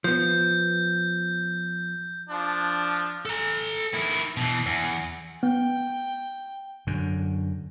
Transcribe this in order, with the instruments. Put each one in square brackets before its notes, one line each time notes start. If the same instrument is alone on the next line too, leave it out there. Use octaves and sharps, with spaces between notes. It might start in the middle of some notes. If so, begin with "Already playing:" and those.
[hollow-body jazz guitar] F3 B3 [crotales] G6
[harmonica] F3 D4
[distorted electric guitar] A4 A#5
D#3 E4
B2 E3
E2
[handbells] B3 [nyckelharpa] G5
[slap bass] F#2 D3